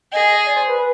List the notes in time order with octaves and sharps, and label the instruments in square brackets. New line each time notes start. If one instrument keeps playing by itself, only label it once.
[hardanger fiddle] G#4 [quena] D#5
[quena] D5
C5
B4